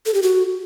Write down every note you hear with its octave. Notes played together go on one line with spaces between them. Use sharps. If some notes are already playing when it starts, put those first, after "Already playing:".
A4
G4
F#4